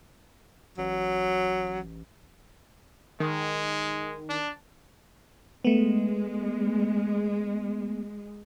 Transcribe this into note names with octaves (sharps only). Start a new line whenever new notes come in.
A1 F#3
D#3 G#3
D4
G#3 A3 B3